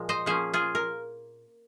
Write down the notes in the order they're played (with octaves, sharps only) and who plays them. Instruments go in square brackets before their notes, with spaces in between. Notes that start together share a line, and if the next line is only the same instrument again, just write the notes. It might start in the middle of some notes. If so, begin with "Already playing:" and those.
Already playing: [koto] A#2 F3 G#3
C5 D#5
F3 A#3 C#4 G#4 C5
F4 G#4
A#4